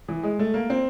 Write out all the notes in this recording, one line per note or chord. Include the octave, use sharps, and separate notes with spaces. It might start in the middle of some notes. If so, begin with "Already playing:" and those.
E3
G#3
A3
A#3
C4